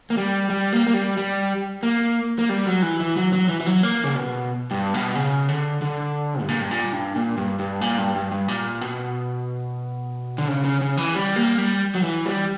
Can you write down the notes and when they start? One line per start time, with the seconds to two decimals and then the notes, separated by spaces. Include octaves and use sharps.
0.10 A#3
0.17 G3
0.50 G3
0.72 A#3
0.87 A#3
0.94 G3
1.17 G3
1.83 A#3
2.39 A#3
2.49 G3
2.66 F#3
2.82 E3
3.00 E3
3.17 F#3
3.33 F#3
3.49 E3
3.60 E3
3.66 F#3
3.83 A#3
4.04 C#3
4.15 B2
4.71 G2
4.94 B2
5.15 C#3
5.48 D3
5.82 D3
6.41 G2
6.48 A#2
6.61 G2
6.71 A#2
6.93 G2
7.16 A#2
7.38 G2
7.59 G2
7.81 A#2
7.98 G2
8.15 G2
8.32 G2
8.48 A#2
8.81 B2
10.38 D3
10.48 C#3
10.64 C#3
10.81 C#3
10.97 E3
11.15 G3
11.36 A#3
11.58 G3
11.95 F#3
12.03 E3
12.26 G3